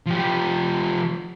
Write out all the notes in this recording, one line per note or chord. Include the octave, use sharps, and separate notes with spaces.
F3 G4